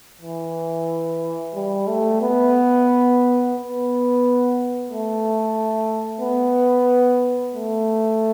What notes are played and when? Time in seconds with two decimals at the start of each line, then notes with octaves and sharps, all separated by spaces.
0.21 E3
1.55 G3
1.88 A3
2.22 B3
3.55 B3
4.88 A3
6.21 B3
7.55 A3